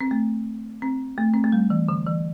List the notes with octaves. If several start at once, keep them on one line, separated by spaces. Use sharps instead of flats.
C4
A3
C4
A3
C4
A3
G3
E3
D3
E3